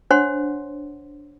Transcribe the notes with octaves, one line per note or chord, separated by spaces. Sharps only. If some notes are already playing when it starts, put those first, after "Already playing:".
D4 C5 C#5 F#5 C6